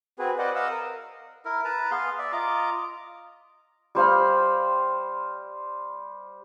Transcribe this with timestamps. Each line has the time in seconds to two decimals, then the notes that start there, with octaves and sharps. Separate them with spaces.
0.19 C4 F#4 G#4 B4
0.38 B4 C5 D5 D#5 F#5
0.55 D#5 F5 F#5 D#6 E6
0.70 A#4
1.45 E4 A#4
1.65 B4 A5 A#5
1.91 B3 G#4 F5 C6
2.19 D5 E5
2.32 F4 D#5 A#5 D6
3.95 G3 C5 F5 B5